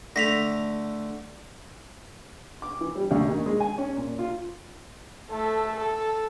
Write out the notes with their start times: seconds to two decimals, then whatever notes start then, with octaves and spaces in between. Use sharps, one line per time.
0.16 D3 A3 A#6 B6 F7
2.62 D6
2.81 E3
2.96 G3
3.11 D2
3.28 D#2
3.46 G#3
3.60 G#5
3.78 C#4
3.96 A#2
4.19 F4
5.31 A3 A4
5.75 A4